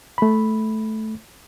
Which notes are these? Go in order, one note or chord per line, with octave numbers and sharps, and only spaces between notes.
A3 B5